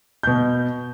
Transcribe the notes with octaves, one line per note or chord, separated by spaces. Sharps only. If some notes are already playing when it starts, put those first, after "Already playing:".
B2 G6